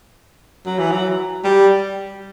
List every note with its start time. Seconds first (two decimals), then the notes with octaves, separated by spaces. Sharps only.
0.66 F#3
0.79 E3
0.92 F#3
1.44 G3